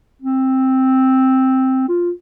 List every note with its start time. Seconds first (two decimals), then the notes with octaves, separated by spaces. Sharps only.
0.22 C4
1.89 F4